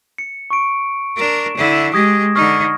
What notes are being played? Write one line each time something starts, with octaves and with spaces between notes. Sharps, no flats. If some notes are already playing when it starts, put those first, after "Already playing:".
C#7
C#6 D7
D4 A#4 D7 E7
D3 E4
G#3 G4 D#6 G#6 A#6
D3 D#4 C#6 F6